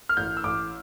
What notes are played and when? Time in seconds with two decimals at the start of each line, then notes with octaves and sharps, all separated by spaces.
0.09 F6
0.17 A1 G6
0.37 E6
0.44 A1 D6